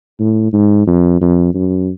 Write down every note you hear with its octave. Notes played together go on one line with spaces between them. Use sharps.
A2
G#2
F2
F2
F#2